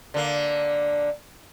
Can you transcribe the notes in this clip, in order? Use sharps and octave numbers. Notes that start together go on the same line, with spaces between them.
D3 A#3